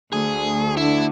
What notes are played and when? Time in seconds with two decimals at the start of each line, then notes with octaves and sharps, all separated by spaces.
0.13 D2 G#4
0.77 D3 E4